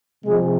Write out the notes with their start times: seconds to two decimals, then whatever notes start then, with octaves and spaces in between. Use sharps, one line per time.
0.24 C3 F3 G#3